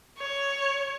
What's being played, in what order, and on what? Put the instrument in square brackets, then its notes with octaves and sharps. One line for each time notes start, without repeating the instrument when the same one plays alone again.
[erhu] C#5